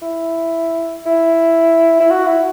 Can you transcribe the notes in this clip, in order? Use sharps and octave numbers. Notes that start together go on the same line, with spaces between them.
E4
E4
E4
F#4
E4